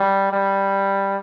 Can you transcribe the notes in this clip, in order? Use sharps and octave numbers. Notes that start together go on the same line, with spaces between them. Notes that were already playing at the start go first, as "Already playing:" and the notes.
Already playing: G3
G3